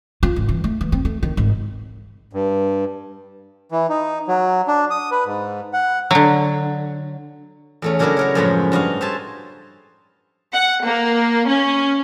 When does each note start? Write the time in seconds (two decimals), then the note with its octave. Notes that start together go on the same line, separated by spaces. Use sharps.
0.23 F4
0.36 G#1
0.49 E3
0.64 A3
0.81 E3
0.92 C4
1.05 A3
1.23 D#3
1.37 G#1
2.33 G2
3.72 E3
3.90 D#4
4.28 F#3
4.68 D4
4.91 D#6
5.11 B4
5.25 G#2
5.73 F#5
6.11 D3 F#3
7.82 E2 A3 C#4
7.99 C#3 F#3 A#3 D4 E4 A#4
8.17 F#4 A#4 C#5
8.35 F#2 A2 F3 G#3 B4 E5
8.72 G2 F#4 D#5 F5
9.01 C5 E5 G#5 A5
10.52 F#5
10.84 A#3
11.47 C#4